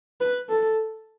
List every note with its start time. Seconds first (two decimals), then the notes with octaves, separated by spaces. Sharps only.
0.21 B4
0.50 A4